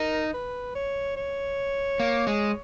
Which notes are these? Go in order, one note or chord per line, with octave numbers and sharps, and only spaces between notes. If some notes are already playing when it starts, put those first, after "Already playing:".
Already playing: D#4 A#4
B4
C#5
C#5
A#3
G#3